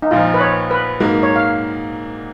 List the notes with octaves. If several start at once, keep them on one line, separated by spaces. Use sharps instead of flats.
D#4
A#1 A#2 F3 F4
B4
C#5
B4
G#2 F#3 A#3 D#4
C#5
F5